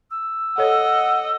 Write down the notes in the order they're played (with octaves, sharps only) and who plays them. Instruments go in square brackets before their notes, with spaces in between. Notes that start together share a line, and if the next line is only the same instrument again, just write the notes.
[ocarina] E6
[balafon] A4 C#5 [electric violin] D#5 [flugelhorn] F#5